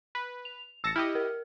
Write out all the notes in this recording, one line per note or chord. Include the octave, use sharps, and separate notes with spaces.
B4
F7
A1 A5 E6 A#6 C#7
E4 G4 D#5 F6
A#4